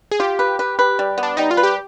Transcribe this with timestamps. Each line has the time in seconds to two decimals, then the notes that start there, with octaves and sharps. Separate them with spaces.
0.11 G#4
0.20 F4 G4
0.39 B4
0.59 B4
0.79 B4
0.99 G3
1.18 B3
1.23 D4
1.37 G3 D#4
1.51 F4
1.57 B4
1.63 G4